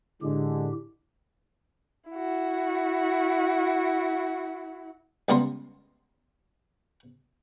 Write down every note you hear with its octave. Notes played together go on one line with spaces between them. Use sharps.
A2 D3 G#3 G4
E4 F#4
C#2 G3 B3 F4 A#4 C6